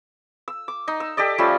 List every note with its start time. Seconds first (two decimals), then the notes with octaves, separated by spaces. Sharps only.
0.48 E6
0.68 D6
0.88 D#4
1.00 E6
1.17 G4 A4 D5 D#5
1.38 F3 G3 A3 C#4